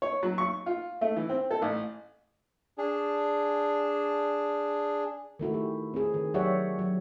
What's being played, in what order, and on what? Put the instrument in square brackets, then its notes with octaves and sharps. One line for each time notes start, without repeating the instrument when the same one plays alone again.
[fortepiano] C#5
F#3
C#6
F4
A3
E3
C4
A4
A1
[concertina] D4 G#4
[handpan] D#3 A3 E4 F#4
G4
C4 G#4
D#3
F#3 G4 C#5 D5 E5 F#5
F#3